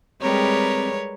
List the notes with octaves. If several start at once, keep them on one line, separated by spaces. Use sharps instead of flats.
G3 G#3 C4 A#4 B4 C#5